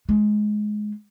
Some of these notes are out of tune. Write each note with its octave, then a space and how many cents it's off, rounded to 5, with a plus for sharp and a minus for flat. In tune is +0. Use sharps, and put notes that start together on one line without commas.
G#3 +15